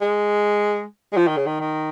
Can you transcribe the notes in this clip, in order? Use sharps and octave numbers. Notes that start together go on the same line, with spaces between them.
G#3
G#3
F3
D#3
C#3
D#3
D#3